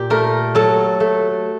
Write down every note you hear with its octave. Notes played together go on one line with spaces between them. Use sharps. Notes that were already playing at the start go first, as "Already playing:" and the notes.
Already playing: A#2 G4
A3 A#4
F#3 A4
A3